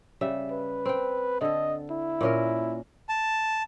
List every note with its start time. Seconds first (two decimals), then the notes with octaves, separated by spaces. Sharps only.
0.21 C#3 G3 E5
0.51 B4
0.86 C4 G5
1.41 D3 A4 D#5
1.91 E4
2.21 A#2 C#4 A#4
3.09 A5